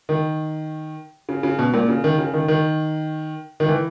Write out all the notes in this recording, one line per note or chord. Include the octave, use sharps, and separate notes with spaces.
D#3
C#3
C#3
B2
A#2
C#3
D#3
C#3
D#3
D#3
D#3
E3